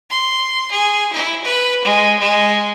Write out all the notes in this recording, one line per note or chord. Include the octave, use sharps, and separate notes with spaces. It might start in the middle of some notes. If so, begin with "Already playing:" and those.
C6
G#4
E4
B4
G#3
G#3